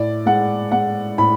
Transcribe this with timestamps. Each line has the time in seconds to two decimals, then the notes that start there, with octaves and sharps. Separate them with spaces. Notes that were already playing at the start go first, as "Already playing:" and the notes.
Already playing: A2 D5
0.26 G#3 F#5
0.72 G#3 F#5
1.18 A2 B5